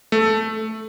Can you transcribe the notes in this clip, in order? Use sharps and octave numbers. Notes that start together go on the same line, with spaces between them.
A3